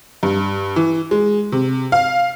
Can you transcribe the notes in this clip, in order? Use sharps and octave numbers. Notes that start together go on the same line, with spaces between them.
G2
E3
G#3
C3
F5